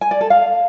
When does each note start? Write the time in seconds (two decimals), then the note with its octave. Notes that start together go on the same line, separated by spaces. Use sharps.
0.01 G#5
0.11 D5
0.21 A4
0.30 F5